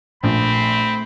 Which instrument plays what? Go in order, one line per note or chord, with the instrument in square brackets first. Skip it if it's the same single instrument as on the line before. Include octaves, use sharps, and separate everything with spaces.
[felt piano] A#1 [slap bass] A3 [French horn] C4 [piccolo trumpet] B5